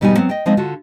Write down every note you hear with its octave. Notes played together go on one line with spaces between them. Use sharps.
E2 B2 G3 B3 D#4 G#5
F#3 B3 C4
D#5 G5
F3 G#3 C4 D#4 D#5
D3 F4 F#4